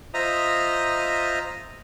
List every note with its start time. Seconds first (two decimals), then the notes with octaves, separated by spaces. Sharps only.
0.14 F4 C5 D#5 E5 A#5 D#6